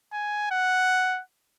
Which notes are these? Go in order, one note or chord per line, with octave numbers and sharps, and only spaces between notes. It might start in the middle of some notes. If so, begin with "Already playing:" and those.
G#5
F#5